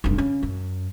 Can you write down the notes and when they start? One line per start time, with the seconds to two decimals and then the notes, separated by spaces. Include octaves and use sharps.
0.04 F1 G2
0.18 C#3
0.43 F#2